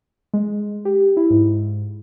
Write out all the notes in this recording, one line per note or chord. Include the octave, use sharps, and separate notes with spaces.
G#3
G4
E4
G#2